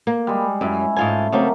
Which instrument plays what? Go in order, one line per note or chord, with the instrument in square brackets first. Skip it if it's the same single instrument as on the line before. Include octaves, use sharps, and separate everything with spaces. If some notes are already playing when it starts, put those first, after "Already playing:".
[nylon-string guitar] A#3
[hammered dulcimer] G3 G#3
[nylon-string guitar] F#2 [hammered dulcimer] C#4 E4
[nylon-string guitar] G#2 F4 G#5 [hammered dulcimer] A3
[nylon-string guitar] C#3 A3 C4 [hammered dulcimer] F#3 A#3